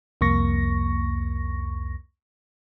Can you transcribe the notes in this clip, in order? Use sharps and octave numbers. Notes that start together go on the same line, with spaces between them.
C2 F2 A#3 C#6 A#6